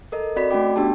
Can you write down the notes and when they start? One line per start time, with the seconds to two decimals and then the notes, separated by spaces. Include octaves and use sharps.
0.12 A4 A#4 D#5
0.36 C4 F#4 D5 D#5 B5 B6
0.51 A3 C#4 F#4 G5 D6
0.76 B3 D4 G4 G5 A5